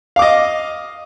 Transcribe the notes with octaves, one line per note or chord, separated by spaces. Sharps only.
D#5 F5 D6